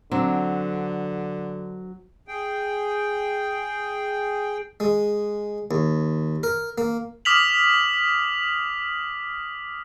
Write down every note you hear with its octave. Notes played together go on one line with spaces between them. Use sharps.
D3 F#3 C4 D4
G#4 G5
G#3
D#2
A#4
A#3
D6 D#6 F6 B6 F7 F#7